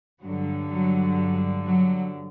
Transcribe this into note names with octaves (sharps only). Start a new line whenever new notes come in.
G2 D3 F#3
F#3
F#3